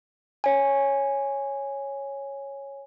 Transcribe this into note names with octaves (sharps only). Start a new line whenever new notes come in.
C#5 G#5